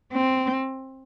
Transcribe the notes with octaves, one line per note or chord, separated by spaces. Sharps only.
C4